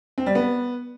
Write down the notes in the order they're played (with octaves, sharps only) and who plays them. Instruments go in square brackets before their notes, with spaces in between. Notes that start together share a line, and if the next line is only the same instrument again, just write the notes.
[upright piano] C4
G3
B3